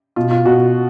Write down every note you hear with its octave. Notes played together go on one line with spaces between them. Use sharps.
B2 F4
F4
B2 F#4